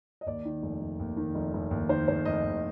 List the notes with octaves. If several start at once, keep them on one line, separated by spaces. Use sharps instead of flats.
D#5
D#2 D5
D#3
F1
F1
D#2
D#3
F1
F1
D#2
D#3 C5
F1 C5
F1 D#5
D#2